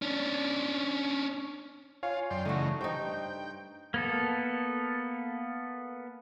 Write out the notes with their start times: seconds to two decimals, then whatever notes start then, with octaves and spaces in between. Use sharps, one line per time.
0.02 C#4 D4
2.03 F4 C#5 F5 G#5
2.30 F#2 D5 G5 C6
2.45 C#3 E3 A3 D#4 F#4
2.81 G2 D#4 C5 G5
3.94 A#3 B3 A4